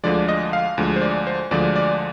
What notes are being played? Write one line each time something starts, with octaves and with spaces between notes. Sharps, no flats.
D2 D3 F3 G#3 D5
D#5
F5
D2 D3 F3 G#3
C5
D5
C5
D2 D3 F3 G#3 D5
D5